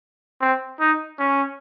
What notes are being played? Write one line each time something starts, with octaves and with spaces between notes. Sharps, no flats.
C4
D#4
C#4